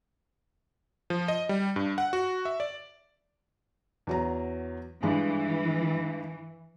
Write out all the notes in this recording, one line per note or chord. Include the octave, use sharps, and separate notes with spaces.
F3
D#5
G3
G2
F#5
F#4
E5
D5
E2 F#3 A#5
G2 E3 G#3